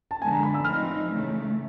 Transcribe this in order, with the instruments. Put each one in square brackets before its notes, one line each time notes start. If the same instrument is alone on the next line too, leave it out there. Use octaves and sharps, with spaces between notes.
[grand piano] A5
[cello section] D3 F3 G#3 B3 [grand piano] G#5
[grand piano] A#5
B5
E6
[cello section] F3 A3 C4 D#4 [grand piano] F6
[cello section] C#3 E3 A3